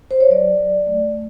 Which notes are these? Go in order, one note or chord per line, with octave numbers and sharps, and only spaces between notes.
C5
C#5
F#3 D5
F#3
A3